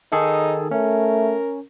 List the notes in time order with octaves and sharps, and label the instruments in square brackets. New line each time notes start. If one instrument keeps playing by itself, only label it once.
[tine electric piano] D#3 G#4 A4 [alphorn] D#4
[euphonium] A3 [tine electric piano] C#4 [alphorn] A#4